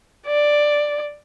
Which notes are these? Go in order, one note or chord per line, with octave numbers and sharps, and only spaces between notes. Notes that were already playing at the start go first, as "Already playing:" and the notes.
D5